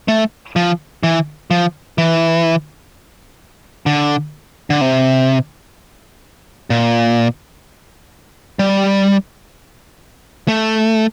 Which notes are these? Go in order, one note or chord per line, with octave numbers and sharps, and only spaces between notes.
A3
F3
E3
F3
E3
D3
D3
C3
A#2
G3
A3